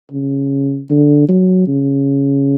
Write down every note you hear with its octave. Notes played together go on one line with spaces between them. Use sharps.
C#3
D3
F#3
C#3